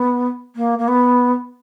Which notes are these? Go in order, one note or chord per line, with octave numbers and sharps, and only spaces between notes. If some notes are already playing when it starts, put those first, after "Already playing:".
Already playing: B3
A#3
A#3
B3